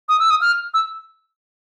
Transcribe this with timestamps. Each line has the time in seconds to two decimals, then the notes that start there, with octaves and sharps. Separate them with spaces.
0.09 D#6
0.19 E6
0.30 D#6
0.41 F6
0.74 E6